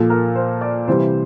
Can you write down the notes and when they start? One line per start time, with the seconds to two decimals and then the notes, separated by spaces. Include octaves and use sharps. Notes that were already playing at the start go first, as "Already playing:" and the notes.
Already playing: A#2 F3 A4
0.10 A#4
0.35 C5
0.61 D5
0.87 C3 E3 G3 C5